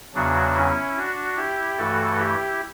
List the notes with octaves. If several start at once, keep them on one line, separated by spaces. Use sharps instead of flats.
E2 C#3 F#3 D4 F#4
C#4 E4
D4 F#4
E4 G4
G2 E3 A3 F#4 A4
E4 G4